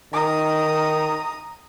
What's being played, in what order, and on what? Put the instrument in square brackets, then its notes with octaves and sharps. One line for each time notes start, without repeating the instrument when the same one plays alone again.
[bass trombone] D#3 [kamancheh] A#5 D#6